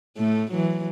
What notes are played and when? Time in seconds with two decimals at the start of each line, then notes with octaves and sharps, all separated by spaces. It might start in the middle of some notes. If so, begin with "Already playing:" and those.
0.17 A2 A3
0.51 E3 F#3